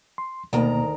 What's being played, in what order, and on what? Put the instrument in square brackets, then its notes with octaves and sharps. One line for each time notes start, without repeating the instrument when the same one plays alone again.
[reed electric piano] C6
[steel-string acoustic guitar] D2 D#3 A#5 [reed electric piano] B2 A#3